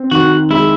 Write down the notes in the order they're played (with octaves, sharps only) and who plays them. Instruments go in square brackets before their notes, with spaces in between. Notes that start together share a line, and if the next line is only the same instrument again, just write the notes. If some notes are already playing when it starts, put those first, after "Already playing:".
Already playing: [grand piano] C4
[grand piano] D#3 [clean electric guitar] F#4
[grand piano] G#3 [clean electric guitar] E4